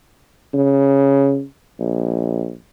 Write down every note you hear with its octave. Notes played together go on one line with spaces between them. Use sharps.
C#3
A#1